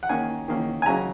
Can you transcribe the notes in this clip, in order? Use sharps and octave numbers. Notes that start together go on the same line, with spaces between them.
F#5
D#3 A#3 C#4 G#5
D#3 A#3 C#4
G#5
C#3 F#3 C#4 A#5